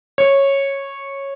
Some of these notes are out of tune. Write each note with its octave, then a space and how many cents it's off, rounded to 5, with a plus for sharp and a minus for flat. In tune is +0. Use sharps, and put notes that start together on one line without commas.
C#5 -10